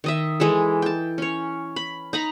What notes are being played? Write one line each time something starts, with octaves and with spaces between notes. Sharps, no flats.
D#3 D#5 E5
E3 G#3 E4 A4
G5 A5
C#4 C#5
B5
D#4 A#5 B5